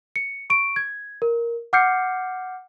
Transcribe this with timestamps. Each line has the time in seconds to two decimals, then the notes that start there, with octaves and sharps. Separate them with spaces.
0.16 C#7
0.50 C#6 D7
0.76 G#6
1.22 A#4
1.73 F#5 D6 F6 G6 C7 C#7